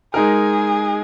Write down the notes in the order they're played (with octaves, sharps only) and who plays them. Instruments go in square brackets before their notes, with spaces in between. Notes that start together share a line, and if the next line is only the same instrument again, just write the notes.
[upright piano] G#3 D#4 A#4 [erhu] G#4